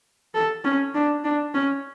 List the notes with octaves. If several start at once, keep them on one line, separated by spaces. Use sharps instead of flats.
A4
C#4
D4
D4
C#4